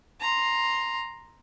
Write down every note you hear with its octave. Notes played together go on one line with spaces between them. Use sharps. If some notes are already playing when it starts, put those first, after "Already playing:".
A#5 C6